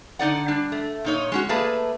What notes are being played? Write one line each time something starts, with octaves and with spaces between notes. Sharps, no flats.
D3 D#4 D5 F#5
G3 D4
A3
A#2 D#4 C#5
G#3 C#4 F#4
A3 A#3 G#4 B4 D5 A5